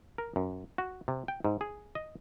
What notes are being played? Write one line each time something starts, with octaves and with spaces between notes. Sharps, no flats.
A#4
F#2
F#4
C3
G5
G#2
G#4
D#5